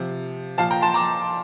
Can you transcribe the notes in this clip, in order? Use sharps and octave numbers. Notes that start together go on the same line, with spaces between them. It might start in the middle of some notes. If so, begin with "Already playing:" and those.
Already playing: C3 F3
A#2 F3 F5 A5
G5 A#5
A5 C6
A#5 D6